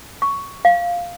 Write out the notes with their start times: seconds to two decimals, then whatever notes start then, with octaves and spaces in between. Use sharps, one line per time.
0.22 C#6
0.65 F5